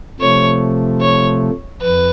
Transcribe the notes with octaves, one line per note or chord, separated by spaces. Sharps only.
C3 F3 A3 C#5
C#5
F2 B4